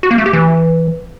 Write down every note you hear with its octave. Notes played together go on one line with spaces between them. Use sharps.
F#4
A#3
A3
G4
E3